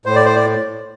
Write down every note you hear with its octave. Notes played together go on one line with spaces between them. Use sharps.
A2 C5
D5
C5
D5